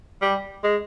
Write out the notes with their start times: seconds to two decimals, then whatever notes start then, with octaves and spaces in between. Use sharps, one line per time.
0.22 G3
0.63 G#3